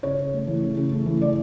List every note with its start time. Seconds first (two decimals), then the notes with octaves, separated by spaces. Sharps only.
0.03 C#3 C#5
0.18 C#3
0.33 A3
0.47 E3
0.63 C#3
0.77 C#3
0.92 A3
1.06 E3
1.21 C#3 D5